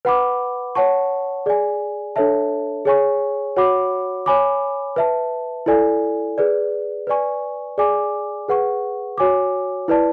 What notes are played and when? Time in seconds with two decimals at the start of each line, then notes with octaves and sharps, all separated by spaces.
0.05 B4 F#5 B5 D6
0.75 C#5 F#5 A5 C#6
1.46 G#4 D5 G#5
2.16 D4 A4 C#5 E5 A5
2.85 G#4 C#5 G#5 C#6
3.56 F#4 C#5 F#5 B5 D6
4.26 C#5 G#5 B5 D6
4.96 B4 E5 A5
5.66 E4 A4 D5 G#5
6.38 G#4 B4 D5
7.07 B4 D5 G#5 C#6
7.78 G#4 D5 G#5 D6
8.49 G#4 B4 F#5 C#6
9.18 F#4 C#5 G#5 D6
9.88 E4 B4 D5 A5